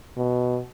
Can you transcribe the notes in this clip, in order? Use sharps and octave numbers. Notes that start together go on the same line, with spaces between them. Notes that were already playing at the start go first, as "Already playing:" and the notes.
B2